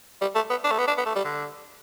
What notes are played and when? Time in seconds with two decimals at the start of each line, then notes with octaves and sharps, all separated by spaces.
0.21 G3
0.35 A3
0.50 B3
0.64 D4
0.71 A3
0.78 B3
0.88 D4
0.97 B3
1.06 A3
1.15 G3
1.24 D3